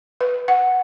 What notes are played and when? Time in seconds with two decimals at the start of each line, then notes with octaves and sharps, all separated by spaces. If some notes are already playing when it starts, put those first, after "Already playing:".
0.21 B4
0.48 F#5